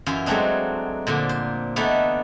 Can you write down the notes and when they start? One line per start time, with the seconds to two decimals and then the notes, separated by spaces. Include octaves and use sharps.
0.06 F#2 E3 F4
0.26 F#3 G#3 A3 C4 D4 D#4
1.07 A#2 D3 F3
1.29 C5
1.76 E3 A3 B3 D4 D#4